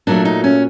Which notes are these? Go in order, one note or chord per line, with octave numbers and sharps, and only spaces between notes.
A#2 F#3 A3 D4
D#4
C#4